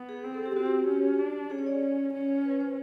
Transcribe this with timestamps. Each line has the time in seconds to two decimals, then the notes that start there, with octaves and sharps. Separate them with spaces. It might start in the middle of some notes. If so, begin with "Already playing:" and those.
Already playing: B3
0.09 G#4
0.24 C4
0.34 A4
0.46 G4
0.56 C4 F#4
0.66 G4
0.87 C#4
1.19 D4
1.50 C#4 G#4
1.58 C#5
1.66 D5
2.14 C#4
2.45 B4
2.61 C5